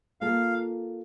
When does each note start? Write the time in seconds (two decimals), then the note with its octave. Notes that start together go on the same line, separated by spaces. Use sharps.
0.21 A#3 F4 A4 F5